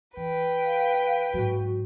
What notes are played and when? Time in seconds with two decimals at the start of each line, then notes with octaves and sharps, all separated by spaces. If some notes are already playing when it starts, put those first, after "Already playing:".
0.17 E3 B4 G5
0.65 F5
1.34 G#2 F#3 F#4